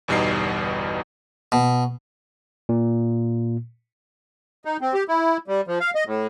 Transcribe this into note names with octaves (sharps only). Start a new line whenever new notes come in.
G1 E2 B2 G3 D#4 C7
B2
A#2
D#4
C4
G4
E4
G3
F3
F5
D#5
A2